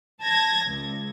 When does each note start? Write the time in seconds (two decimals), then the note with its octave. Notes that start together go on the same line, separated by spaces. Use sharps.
0.21 A5 G#6 A#6
0.66 C#2